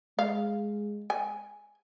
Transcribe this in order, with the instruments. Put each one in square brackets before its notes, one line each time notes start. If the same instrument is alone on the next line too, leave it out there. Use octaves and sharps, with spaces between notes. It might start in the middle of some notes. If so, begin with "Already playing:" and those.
[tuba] G#3 [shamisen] F5
[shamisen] G#5